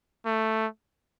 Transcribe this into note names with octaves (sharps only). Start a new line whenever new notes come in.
A3